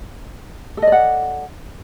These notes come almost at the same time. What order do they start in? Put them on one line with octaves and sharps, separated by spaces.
A4 D#5 D5 F#5